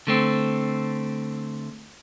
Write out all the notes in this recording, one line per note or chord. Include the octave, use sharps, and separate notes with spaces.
D3 A3 C4